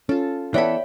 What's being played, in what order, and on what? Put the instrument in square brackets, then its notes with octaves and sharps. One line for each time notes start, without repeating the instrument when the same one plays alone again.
[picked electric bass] C#4 [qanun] F4 A4
[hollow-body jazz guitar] E3 B3 A4 [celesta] C#5 D5 E5 [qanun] G5 B5